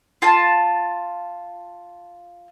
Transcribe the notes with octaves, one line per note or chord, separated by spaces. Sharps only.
F4 A5